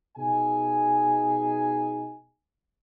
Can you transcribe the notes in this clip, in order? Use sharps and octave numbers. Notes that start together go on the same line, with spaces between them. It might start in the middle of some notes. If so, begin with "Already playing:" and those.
B2 D#4 G#4 G#5